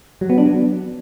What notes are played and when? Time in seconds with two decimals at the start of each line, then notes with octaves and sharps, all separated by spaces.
0.21 F#3
0.30 B3
0.38 D4
0.46 F#3